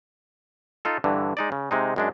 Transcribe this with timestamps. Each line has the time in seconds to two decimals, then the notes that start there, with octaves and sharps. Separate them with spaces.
0.85 D#4 F4 A4
1.04 G2 D3 E3
1.37 G#3 D#4 D5
1.52 C#3
1.71 C3 G#3 D#4
1.96 F#2 G#3 D4